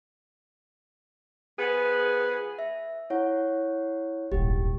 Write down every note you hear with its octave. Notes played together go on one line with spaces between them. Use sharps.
F3 B3 G#4 B4
E5
E4 C#5 F#5
D#1 G#1 G4